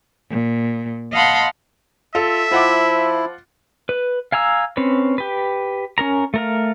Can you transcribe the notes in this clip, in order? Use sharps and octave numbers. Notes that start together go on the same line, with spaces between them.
A#2
D#5 F5 F#5 A5 B5 C6
F4 A4 E5
F3 E4 F4 F#5 D6
B4
F5 G#5 A#5 E6
C4 C#4 B4
G4 B4
C#4 A#4 A#5
A3 A#4 F5